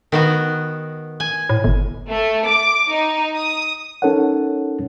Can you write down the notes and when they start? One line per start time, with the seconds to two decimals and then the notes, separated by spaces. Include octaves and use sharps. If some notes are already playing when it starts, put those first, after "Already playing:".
0.12 D#3 B3 F#4
1.20 G#5
1.49 A2
1.64 G1
2.09 A3
2.46 D6
2.88 D#4
3.36 D#6
4.02 C#4 D#4 A4 A#4 C#5 F#5